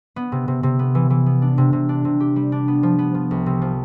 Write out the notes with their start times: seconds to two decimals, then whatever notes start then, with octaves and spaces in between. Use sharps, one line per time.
0.16 B3
0.32 C3
0.48 C3
0.63 C3
0.79 B3
0.95 E3
1.10 E3
1.26 B3
1.42 D4
1.58 C3
1.73 C3
1.89 D4
2.05 C3
2.20 G4
2.36 G3
2.52 D4
2.68 B3
2.83 F3
2.99 B3
3.15 F3
3.31 C2
3.46 C3
3.62 F3